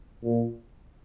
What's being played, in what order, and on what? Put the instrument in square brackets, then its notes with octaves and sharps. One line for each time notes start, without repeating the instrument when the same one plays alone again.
[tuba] A#2